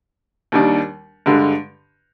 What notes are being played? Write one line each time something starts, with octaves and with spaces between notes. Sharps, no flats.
D#2 D#3 G3 D4
G2 D3 G#3